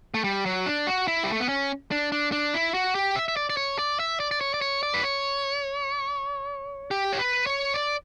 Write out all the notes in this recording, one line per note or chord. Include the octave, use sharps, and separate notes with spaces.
A3
G3
F#3
D4
F#4
E4
G3
A3
B3
C#4
D4
D4
D4
E4
F#4
G4
E5
E5
D5
D5
C#5
D5
E5
D5
D5
C#5
D5
C#5
D5
B4
C#5
G4
C#5
B4
C#5
D5